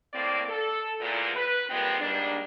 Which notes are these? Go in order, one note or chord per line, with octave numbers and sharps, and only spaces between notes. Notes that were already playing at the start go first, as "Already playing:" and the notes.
A2 A#3 C4 D5
A4
E2 A#2
B4
A#2 G3 G#3 B3 C4
G#2 G3 A#3 D4